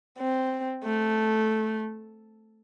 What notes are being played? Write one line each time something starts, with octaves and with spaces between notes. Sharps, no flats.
C4
A3